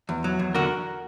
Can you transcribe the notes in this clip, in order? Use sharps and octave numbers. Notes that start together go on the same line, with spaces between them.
E2
F#3
E2
D3 F#4 A#4